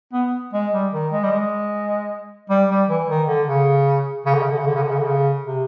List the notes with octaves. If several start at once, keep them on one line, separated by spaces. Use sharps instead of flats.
B3
G#3
G3
D#3
G#3
G3
G#3
G3
G3
E3
D#3
D3
C#3
C#3
D3
C#3
D3
C#3
D3
C#3
D3
C#3
D3
C#3
C3